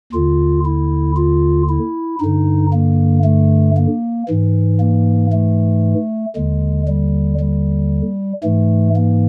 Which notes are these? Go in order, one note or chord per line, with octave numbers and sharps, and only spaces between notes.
D#2 D3 F4
E4
F4
E4
G2 D3 D#4
A#3
A3
A#3
G#2 E3
A#3
A3
D#2 D3 G#3
G3
G3
G#2 E3 A3
A#3